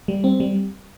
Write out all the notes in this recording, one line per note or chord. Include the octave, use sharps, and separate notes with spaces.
G3
C4
G3